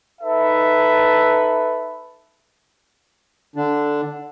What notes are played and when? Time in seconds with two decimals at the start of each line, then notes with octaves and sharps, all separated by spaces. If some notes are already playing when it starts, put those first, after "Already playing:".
0.22 D#4 A4 B4 E5
3.56 D3 D4